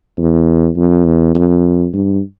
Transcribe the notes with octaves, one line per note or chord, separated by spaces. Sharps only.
E2
F2
E2
F2
G2